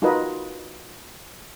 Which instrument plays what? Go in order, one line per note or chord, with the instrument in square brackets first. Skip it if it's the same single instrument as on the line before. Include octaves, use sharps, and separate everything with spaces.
[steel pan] D#4 F4 F#4 A#4 B4 D#5